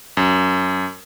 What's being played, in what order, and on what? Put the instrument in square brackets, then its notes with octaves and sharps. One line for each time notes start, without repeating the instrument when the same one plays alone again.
[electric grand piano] F#2